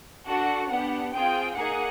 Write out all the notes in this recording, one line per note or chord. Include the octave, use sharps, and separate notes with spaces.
D4 F#4 A4 F#5
B3 D4 G4 F#5
C4 F4 G#4 G5
A#3 D#4 G#4 F#5